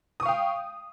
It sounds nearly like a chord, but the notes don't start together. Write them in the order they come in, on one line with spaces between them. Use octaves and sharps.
D#6 C#6 F5 G5